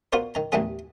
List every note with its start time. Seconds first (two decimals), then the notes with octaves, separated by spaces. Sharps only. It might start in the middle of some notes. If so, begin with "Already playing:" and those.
0.13 B3 F4 F#4 A#4 C5 D5
0.35 D#3 A#5
0.52 A1 D#2 E3 G3 B3 G#4